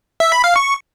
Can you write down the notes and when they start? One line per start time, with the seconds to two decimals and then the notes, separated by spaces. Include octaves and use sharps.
0.20 E5
0.32 B5
0.44 F5
0.56 C#6